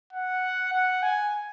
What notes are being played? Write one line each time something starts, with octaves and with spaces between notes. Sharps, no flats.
F#5
F#5
G#5